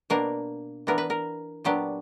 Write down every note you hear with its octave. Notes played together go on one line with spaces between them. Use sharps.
B2 A#3 D4 A#4
E3 B3 D4 A#4
B4
A#4
A#2 F#3 B3 D4 G4